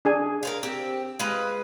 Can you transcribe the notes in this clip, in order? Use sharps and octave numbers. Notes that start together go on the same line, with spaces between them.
D4 G#4 G#5
A#4 C5 F5
C4 G4
G#3 F4 B4